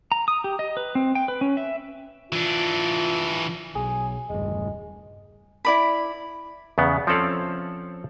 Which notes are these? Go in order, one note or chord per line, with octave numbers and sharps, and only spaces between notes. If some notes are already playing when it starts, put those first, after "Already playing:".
A#5
D#6
G4
D#5
B4
C4
G5
B4
C#4
E5
E3 D4 F4
B1 G#4
E1 G2 G#3
E4 D5 B5
E2 C#3 B3
F3 C4 C#4 A4 D5 F5